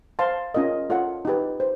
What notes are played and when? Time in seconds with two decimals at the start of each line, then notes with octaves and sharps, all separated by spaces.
0.19 C5 F5 A5 C6
0.54 C#4 F4 A#4 D#5
0.90 F4 A4 C#5 F#5
1.25 D#4 G4 B4
1.60 C5